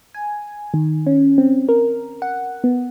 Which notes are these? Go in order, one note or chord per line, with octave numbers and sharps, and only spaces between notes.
G#5
D#3
C#4
C4
A#4
F#5
B3